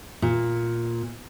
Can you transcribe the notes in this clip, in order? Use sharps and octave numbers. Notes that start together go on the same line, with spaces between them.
A#2